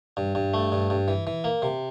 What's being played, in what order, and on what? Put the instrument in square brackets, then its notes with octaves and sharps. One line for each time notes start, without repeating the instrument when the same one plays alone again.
[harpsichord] G2
G2
A3
G2
G2
E3
E3
A#3
C3